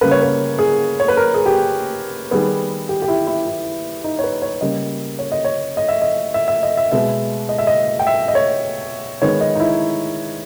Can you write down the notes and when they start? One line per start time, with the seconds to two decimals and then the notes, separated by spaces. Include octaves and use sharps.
0.01 C#3 G3 A#3 B4
0.11 C#5
0.22 B4
0.59 G#4
1.00 C#5
1.08 B4
1.17 A#4
1.34 G#4
1.46 G4
2.31 D#3 G3 B3 G#4
2.89 G4
3.02 G4
3.08 E4
3.27 E4
3.47 E4
4.04 D#4
4.19 C#5
4.24 B4
4.42 C#5
4.61 C#3 G3 A#3 D#5
5.19 C#5
5.32 D#5
5.45 C#5
5.77 D#5
5.89 E5
6.02 D#5
6.34 E5
6.48 E5
6.63 D#5
6.77 E5
6.92 B2 G#3 B3 E5
7.49 D#5
7.58 E5
7.67 D#5
8.00 G5
8.07 E5
8.28 D#5
8.35 C#5
9.22 D#3 G#3 B3 C#5
9.41 D#5
9.55 D#4
9.60 E4